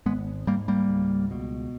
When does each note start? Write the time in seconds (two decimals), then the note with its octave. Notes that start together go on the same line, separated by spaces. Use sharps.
0.06 G#1 G#3 B3
0.47 G#2 G3 A#3
0.68 G3 A#3
0.89 C#2
1.31 B2